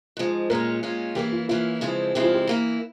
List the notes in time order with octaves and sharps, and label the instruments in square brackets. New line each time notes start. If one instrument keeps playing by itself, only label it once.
[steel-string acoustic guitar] G#2 F3 G#3
[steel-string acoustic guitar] A#2 G#3 C#4 F4 [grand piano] A#4
[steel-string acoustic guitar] A#2 G#3 C#4 F4
[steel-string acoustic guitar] E3 A#3 C#4 E4 [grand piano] G4
[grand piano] F4
[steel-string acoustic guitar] E3 A#3 C#4 E4 [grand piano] F4
[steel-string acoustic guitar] C#3 F3 G#3 C4 E4
[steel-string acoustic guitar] C#3 F3 G#3 C4 E4 [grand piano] G4
[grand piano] F4
G4
[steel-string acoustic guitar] E3 A#3 E4